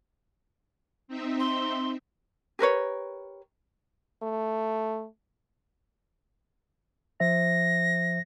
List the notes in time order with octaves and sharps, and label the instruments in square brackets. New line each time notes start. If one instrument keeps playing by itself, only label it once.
[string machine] C4 D#4 E5
[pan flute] C6
[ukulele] G4 A#4 B4 C#5
[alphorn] A3
[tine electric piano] F3 C5 E5 [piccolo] A#6